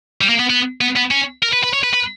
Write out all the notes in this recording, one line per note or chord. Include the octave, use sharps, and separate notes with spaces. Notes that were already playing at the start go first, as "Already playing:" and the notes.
G3
A#3
B3
B3
B3
B3
C#4
A#4
B4
B4
C#5
B4
B4